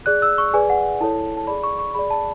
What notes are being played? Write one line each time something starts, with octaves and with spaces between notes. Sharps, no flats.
G#4 D5 F#6
E6
C#6
G#4 B4 D5 G#5
F#5
E4 A4 C#5 A5
A5
G#4 D5 B5
C#6
C#6
G#4 D5 B5
A5